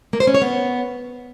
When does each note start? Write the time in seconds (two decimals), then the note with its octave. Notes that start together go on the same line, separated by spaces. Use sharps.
0.13 A#3
0.20 C5
0.27 C#4
0.34 C#5
0.42 B3